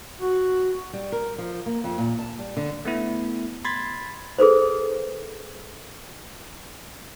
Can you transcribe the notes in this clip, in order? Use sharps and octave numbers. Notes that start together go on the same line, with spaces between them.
F#4
G3
A#4
F3
A#3
F2
A#2
A5
G3
D3
A3 B3 E4
B5 C6 G#6 A6 B6
G#4 A4 B4 C5